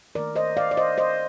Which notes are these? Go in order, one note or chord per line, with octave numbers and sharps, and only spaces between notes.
D#3 A3 A#4 D5
C5 D#5
D5 F5
D5
C5 D#5
C5 D#5